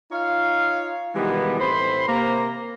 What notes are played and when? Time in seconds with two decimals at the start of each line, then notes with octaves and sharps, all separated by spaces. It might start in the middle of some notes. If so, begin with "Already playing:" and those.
0.12 D#4 F4 C#5 F5
1.15 B2 D#3 E3 G3 G#3 B3
1.59 A2 E3 C4 C5 B5 C6
2.08 C3 A#3 A#5